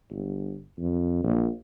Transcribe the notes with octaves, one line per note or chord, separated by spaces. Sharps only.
G1
F2
A#1